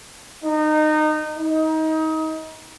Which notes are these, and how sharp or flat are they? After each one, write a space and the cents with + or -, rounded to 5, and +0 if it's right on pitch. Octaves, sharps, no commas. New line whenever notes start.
D#4 -25
D#4 +25